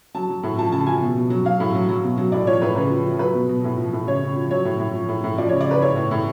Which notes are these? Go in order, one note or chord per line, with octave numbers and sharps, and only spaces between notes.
F#3 A5
F#3
A2
F3 A5
C#3 A5
F3 G#5
B2
B2
F#3
F#3 F5
A2
F#3
F#3
B2
F#3
A2 D5
F3 C#5
A2 B4
C#3 B4
F3
F3
F#3 B4
B2
B2
A2
F3
A2
C#3 C#5
C#3
F3
F#3 C#5
A2
A2
F3
A2
A2
F3 D5
C#3 C#5
D5
C#3 B4
A2 C#5
A2
A2